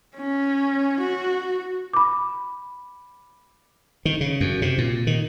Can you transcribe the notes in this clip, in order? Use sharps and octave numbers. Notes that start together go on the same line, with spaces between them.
C#4
F#4
B5 D6
D#3
C#3
F#2
C3
A#2
D#3